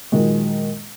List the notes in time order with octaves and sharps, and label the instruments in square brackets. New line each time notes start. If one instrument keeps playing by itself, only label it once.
[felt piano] A#2 D#3 F#3 G#3